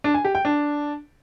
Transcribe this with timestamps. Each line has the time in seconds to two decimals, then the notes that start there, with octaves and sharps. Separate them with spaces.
0.04 D4
0.14 G#5
0.25 G4
0.35 G5
0.45 D4